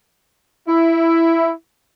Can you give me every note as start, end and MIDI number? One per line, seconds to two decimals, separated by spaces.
0.67 1.51 64